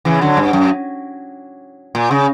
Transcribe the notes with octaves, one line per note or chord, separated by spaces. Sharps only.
C#3 E3
D3 F#3
G2
F#2
A#2
C#3